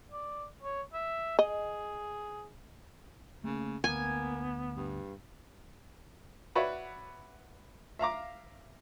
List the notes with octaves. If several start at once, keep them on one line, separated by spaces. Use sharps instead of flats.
D5
C#5
E5
G#4 D#5
C#3 A3 A#3
D2 A#3 B3 G#5
G2
F#4 B4 C#5 D5 E5 F#5
E5 F5 A#5 D6